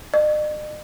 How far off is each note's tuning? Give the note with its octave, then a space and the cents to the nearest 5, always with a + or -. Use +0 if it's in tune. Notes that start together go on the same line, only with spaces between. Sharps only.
D#5 -45